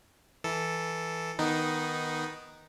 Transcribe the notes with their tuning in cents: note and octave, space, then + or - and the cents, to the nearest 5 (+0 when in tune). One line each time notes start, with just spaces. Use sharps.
E3 -5 A4 +0
D#3 +5 B3 -10 D#4 +0